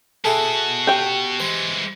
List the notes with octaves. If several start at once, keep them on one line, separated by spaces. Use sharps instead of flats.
B2 E4 F#4 G#4 A4
G4 G5
E3 G#3 C5